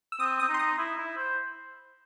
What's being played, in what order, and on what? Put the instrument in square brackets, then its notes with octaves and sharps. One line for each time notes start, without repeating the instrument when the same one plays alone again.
[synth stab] E6
[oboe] C4 [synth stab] D#6
[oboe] C4 [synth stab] D#6
[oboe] D#4
[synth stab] C6
D#6
[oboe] E4
E4
C5